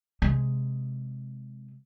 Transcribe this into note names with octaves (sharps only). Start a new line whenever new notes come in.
C3 G#3